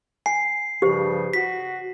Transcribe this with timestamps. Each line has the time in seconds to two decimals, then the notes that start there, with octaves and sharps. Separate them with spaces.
0.26 G#5 C7
0.82 G2 C#3 F3 G4 C5
1.34 F#4 B6